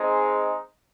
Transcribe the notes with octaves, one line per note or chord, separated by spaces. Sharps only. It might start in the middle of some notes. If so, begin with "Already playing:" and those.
Already playing: G#3 C4 D#4 G#4